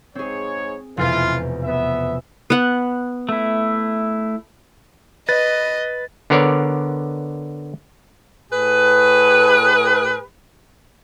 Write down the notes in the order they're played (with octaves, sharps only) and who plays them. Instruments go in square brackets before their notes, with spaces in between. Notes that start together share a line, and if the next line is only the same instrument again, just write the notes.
[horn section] G#2 C#5 [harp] C4 G#4
[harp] F1 E2 B2 [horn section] E3 F4
[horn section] B3 E5
[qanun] B3 F#5
[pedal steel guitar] A3 E4
[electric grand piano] B4 [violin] D#5 [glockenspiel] A6
[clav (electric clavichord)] D3 B3 A#4 C#5 D5
[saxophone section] A2 G#4 B4